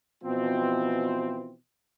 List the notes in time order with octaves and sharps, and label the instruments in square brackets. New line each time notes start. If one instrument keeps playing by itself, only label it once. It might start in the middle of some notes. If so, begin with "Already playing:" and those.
[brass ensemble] B2 E3 F3 C4